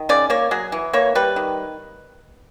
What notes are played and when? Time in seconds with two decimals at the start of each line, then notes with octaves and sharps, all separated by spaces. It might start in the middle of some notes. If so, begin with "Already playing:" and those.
Already playing: D#3
0.09 C#3 D5
0.30 A#3 C#5
0.51 F#3 G#4
0.72 E3
0.93 A#3 C#5
1.15 G3 B4
1.36 D#3